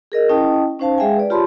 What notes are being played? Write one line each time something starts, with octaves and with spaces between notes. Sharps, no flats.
G#4 A#4 D#5
C#4 E4 D#5 G5 A5 D#6
C#4 D#4 C5 F5 A5
G#3 G#4 E5 F5 G5 G#5
B4 D5
F4 G4 C#5 A5 B5 C6